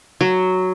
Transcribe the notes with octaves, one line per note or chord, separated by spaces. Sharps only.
F#3